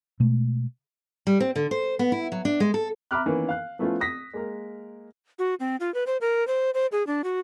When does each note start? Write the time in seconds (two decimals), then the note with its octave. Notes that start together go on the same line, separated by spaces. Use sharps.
0.20 B2 G#3 A3
1.27 G3
1.40 C4
1.56 D3
1.71 C5
1.99 B3
2.12 E4
2.32 F#3
2.45 D4
2.60 G#3
2.74 A4
3.11 E5 A#5 B5 D6 F6 F#6
3.26 D#3 E3 A#3 B3 C#4
3.49 F5 F#6
3.79 F3 A3 B3 C#4 E4 F4
4.01 D#6 A#6 B6
4.34 G#3 A#3 A#4
5.39 F#4
5.60 C4
5.80 F4
5.94 B4
6.07 C5
6.21 A#4
6.47 C5
6.74 C5
6.92 G#4
7.07 D4
7.24 F#4